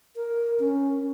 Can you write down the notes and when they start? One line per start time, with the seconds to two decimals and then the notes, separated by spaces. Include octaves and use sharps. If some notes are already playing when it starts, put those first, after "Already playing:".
0.16 A#4
0.60 C#4